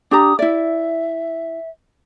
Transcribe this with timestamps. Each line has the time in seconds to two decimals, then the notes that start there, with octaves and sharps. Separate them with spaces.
0.11 D4 G4 A#5 D#6
0.39 E4 D5 E5